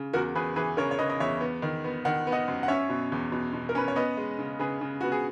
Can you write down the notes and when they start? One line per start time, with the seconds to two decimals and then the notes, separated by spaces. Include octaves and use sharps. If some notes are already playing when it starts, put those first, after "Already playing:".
Already playing: C#3
0.13 E2 F#4 A#4
0.35 E2 G#4 B4
0.56 E3 G#4 B4
0.77 C#3 A#4 C#5
0.91 C#5
0.99 C#3 B4 D#5
1.10 D#5
1.20 E2 C#5 E5
1.41 B3
1.62 D#3
1.84 B3
2.05 D#3 F#5
2.27 B3
2.32 D#5 F#5
2.48 F#2
2.63 F#5
2.68 C#4 C#5 E5
2.89 B2
3.12 E2
3.32 B2
3.53 B2
3.69 A#4
3.75 C#4 B4
3.88 C#5
3.96 B3 B4 D#5
4.17 G#3
4.39 C#3
4.59 C#3 G#4 B4
4.81 C#3
5.01 B3 F#4
5.12 G#4